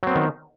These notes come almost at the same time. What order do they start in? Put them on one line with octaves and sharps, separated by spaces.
F#3 C4 B3 D#3